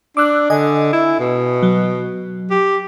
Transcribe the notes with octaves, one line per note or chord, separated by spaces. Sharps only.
D4 D6 E6 F#6
D3 D#5 G#5
E4
B2
F#3
G4